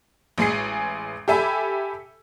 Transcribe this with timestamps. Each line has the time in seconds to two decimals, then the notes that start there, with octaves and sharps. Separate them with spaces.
0.38 A1 G#3 G#4 C7
1.28 G4 A4 E5 G#5 B5